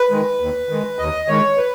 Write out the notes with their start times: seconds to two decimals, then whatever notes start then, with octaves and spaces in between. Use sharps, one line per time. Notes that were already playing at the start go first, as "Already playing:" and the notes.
Already playing: B4
0.11 D#3 G#3
0.40 D#2
0.69 D#3 G#3
0.98 D#2 D#5
1.28 D#3 G#3 C#5
1.57 B4